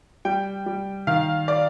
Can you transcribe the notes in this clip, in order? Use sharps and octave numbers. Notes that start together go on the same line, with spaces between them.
G3 G5
G3
D#3 F5
D5